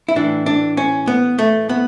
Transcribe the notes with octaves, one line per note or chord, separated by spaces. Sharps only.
E4
A2 E3 D4
D4
C#4
B3
A3
B3